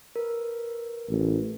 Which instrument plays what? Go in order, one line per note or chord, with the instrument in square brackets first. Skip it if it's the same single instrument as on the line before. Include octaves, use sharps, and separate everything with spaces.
[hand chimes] A#4 B4
[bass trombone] A1